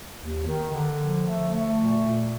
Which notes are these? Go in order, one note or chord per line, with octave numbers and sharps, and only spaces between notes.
D#2
D#3
D3
F3
A3
A3
A#2
A#2